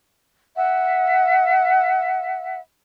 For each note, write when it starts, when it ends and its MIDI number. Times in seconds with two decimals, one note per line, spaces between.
0.56 2.59 76
0.56 2.59 78